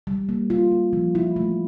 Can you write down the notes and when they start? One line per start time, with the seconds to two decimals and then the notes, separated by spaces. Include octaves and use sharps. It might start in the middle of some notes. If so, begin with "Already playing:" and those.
0.07 G3
0.29 A#3
0.50 F4
0.72 A#3
0.93 F3
1.15 E4
1.36 A3